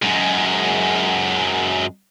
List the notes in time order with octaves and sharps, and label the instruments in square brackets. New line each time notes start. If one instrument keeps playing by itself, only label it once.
[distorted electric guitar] F#2 G#3